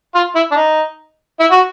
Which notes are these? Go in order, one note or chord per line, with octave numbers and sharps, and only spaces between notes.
F4
E4
D4
D#4
E4
F#4